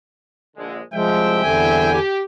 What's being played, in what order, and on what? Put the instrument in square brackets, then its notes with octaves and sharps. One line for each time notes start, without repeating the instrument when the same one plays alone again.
[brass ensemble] A#1 D3 G#3
[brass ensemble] C2 E5 G5 [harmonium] F3 G#3
[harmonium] E2 D3 G#5
[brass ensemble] G4